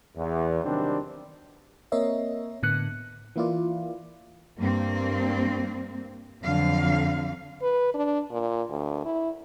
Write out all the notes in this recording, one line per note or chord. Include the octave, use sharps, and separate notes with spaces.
E2
C3 D#3 F#3 G3 C4 D4
A#3 C4 A#4 C#5 D#5 E5
A2 D3 B3 F#6 C#7
E3 A#3 E4 F4 D5
G2 A#3 C4
F2 D3 F#3 F5
B4
D4
A#2
D2
E4